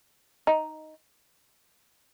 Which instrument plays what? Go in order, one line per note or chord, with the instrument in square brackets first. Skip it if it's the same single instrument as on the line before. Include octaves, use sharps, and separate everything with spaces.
[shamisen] D#4